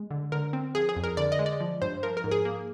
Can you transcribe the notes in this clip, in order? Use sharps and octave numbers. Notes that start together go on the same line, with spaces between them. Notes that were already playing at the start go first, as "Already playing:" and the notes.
Already playing: G#3
D3
D3 A#4
C4
F3 G#4
G#4
F2
A#4
D3 D5
D#5
G#3
D5
F3
G2 C5
F3 A#4
A#4
G#2
G#4
A#3